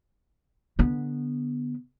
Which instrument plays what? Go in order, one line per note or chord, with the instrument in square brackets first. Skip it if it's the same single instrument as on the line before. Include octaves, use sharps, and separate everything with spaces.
[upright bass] D3 B3